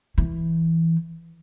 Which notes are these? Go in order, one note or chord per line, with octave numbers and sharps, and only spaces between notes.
E3